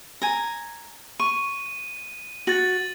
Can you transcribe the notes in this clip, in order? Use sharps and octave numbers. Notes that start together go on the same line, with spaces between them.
G#5 A#5
C#6 D#7
F#4 A6 F#7